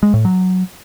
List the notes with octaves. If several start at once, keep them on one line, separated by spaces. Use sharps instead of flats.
G#3
A2
F#3